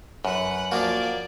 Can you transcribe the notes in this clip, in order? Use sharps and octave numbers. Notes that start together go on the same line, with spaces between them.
F#2 B4 F#5
F3 A#3 D4 F#4 D5